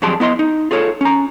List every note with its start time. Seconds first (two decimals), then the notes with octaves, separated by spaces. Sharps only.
0.02 F2 F#3 G3 G#4 A5 C6
0.20 B3 E4 D#5 C6
0.39 D#4
0.71 F4 G#4 A4 C#5
1.01 C#4 A#5